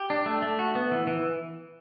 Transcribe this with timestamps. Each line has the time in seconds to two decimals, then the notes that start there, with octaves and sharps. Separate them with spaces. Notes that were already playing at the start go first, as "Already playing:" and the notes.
Already playing: G4
0.10 D4
0.26 A3
0.42 A3
0.59 F#4
0.75 B3
0.91 E3
1.07 E3